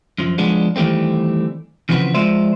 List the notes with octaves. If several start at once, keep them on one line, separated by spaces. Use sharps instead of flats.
F#2 F3
F3 G#3 B3 D4
D#3 E3 G3 A3 C4
C#3 E3 F3 C4 F#4 B4
F3 G#3 F4 C5 D5 E5